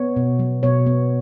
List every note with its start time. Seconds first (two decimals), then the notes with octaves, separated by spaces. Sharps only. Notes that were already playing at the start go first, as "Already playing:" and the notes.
Already playing: B3 C#5
0.16 B2
0.39 F#3
0.63 B2 C#5
0.86 B3